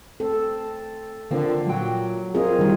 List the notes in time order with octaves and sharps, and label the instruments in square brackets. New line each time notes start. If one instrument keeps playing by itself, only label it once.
[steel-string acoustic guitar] C4 [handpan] A4
[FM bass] D3 [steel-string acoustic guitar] F3 A#3 C4
[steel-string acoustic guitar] A#2 G5 [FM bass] F#3
[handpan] C4 F4 G#4 [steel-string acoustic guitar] A#4 D#5
[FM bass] D#3 [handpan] G3 E4